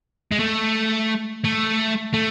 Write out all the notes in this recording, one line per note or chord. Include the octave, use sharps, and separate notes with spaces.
G#3
A3
A3
A3